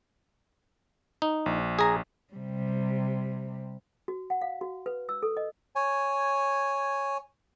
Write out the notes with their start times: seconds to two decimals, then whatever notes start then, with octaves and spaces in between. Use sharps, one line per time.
1.22 D#4
1.46 A#1
1.79 G#4 A#5
2.34 C3 G3
4.08 F#4
4.30 F#5
4.42 F5
4.61 F#4
4.86 B4
5.09 E6
5.23 A4
5.37 D#5
5.76 C#5 G#5